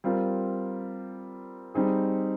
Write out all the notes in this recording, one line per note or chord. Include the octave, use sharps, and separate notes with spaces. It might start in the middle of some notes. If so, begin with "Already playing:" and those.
G3 C4 F4 A#4
G3 C4 D#4 G#4